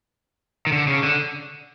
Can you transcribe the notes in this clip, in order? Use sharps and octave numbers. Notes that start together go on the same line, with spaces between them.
D#3
D3
C#3
D3